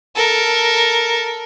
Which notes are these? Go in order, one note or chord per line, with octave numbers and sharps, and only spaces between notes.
A4 A#4